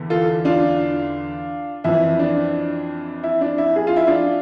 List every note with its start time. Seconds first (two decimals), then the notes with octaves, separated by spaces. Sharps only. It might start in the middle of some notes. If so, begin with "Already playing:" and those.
Already playing: E2 D3
0.10 F4 A4
0.45 D4 F4
1.84 F2 E3 E4
2.19 D4
3.23 E4
3.41 D4
3.58 E4
3.76 G#4
3.87 F4
3.96 E4
4.07 D4 F4